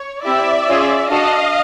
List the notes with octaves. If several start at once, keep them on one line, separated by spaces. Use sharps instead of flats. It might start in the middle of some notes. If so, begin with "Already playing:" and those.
Already playing: C#5
C4 E4 G4 D5 E5
C#4 F4 G#4
D4 F#4 A4 D#5 F5